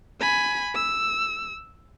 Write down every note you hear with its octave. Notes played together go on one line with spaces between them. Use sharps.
G#5 B5
E6